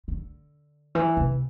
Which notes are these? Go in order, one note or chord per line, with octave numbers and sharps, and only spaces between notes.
D3
E3
C3